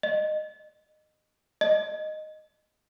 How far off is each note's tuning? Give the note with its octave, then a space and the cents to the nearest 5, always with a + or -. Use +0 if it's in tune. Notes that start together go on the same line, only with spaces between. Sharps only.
D#5 -20
D#5 -5